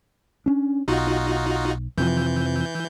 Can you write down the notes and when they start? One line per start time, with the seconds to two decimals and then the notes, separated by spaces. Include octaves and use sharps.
0.46 C#4 D4
0.88 B1 D#4 F4 F#4
1.98 F2 C3 E3 F3 G6